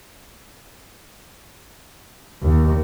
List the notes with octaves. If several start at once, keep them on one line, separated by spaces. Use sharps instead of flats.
D#2